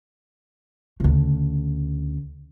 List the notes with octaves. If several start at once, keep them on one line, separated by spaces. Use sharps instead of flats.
D2 C#3